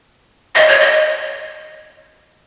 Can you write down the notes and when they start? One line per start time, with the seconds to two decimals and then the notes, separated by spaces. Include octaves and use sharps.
0.55 D#5
0.68 C#5
0.80 D#5